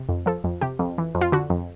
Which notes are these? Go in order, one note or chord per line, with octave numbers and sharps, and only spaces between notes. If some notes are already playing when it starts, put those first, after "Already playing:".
Already playing: C3
F2
F3 A4
F2
C3 G4
F2
E3
F2
F4
D3 F#4
F2